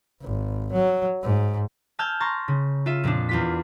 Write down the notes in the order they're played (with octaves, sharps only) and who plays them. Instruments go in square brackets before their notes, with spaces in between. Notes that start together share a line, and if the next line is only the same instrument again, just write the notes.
[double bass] G#1
F#3
G#2
[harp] G#5 A5 E6 F6 G6 G#6
A#5 C6 C#6 A6
C#3
F4 E5 D#7
F2 A#2 C4 D4
E2 F4 B6